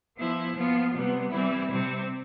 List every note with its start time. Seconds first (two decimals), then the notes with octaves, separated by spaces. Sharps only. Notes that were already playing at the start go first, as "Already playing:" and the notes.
0.17 F3 B3 E4
0.55 F3 B3 F4
0.93 C3 G3 B3
1.31 E3 G3 C4 E4
1.70 C3 G3 C4